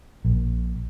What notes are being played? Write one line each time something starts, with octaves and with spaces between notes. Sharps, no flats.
A#1